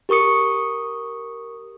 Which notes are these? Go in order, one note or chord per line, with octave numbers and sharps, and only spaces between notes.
G4 A#4 C#6 D#6 C#7